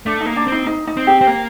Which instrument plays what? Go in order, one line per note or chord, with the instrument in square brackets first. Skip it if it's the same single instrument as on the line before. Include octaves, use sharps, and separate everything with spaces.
[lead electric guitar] A3 [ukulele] D4
[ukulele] D#4
[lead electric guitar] A#3
[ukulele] D4
[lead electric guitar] C4
[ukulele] D#4
D#4
D#4
[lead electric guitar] C4
[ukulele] G4
[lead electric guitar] C4
A#3